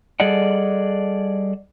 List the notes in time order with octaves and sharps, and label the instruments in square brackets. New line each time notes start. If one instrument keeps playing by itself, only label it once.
[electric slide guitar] G3 G#4 A4 D5 D#5 F#5